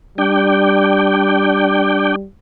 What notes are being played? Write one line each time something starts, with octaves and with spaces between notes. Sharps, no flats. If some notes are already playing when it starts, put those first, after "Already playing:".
G3 D4 G5